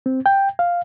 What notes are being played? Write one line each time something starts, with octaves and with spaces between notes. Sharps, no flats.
C4
G5
F5